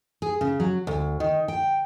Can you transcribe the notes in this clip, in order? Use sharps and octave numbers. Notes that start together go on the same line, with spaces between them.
G#4
C#3
F#3
D2
D#3
G5